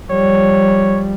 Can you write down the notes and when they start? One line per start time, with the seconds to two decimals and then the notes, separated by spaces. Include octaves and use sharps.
0.11 F3 G3 C#5